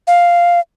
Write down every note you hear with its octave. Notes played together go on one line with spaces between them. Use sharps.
F5